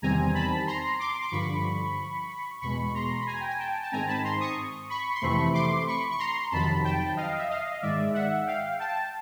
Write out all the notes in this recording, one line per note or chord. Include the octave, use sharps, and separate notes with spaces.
E2 C3 D#3 G3 C4 G#5 A#5
A5 B5
A#5 C6
C6 D6
D6
G2 D3 F3 B5 C#6
E2 B2 G#3 B5 C#6
A#5 C6
B5
G#5 A#5
G5
G#5
G5 A5
A5
G#2 D#3 G#3 C4 G#5 A#5
A5 B5
A#5 C6
C#6 D#6
B5 C#6
C6
F2 C3 E3 A3 C4 B5 C#6
C6 D6
B5 C#6
C#6
A#5 C6
F2 C3 D#3 F#3 A5 B5
G5 A5
D#5 F5
E5
D#5 F5
D#5
G#2 D#3 G#3 D5 E5
E5 F#5
F5 G5
G5 A5